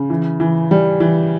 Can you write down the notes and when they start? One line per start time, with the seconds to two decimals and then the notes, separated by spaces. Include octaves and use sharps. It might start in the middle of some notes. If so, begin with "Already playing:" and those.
Already playing: C#3
0.10 E3
0.40 E3
0.71 G3
1.00 E3